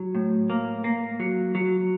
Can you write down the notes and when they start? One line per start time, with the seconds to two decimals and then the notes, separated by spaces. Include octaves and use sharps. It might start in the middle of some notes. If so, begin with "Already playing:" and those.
Already playing: F#3
0.15 A2
0.50 A#3
0.84 A#3
1.20 F#3
1.55 F#3